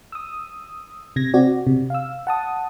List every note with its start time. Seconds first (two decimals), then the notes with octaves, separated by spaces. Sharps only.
0.12 D#6 E6
1.16 C3 G#6 A#6
1.34 C4 F#4 D5
1.67 C3
1.90 F5 E6
2.27 F#5 A5 D#6